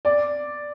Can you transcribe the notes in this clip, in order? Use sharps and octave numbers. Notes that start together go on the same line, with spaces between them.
D5